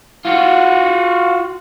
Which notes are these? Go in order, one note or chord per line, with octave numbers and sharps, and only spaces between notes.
F4 F#4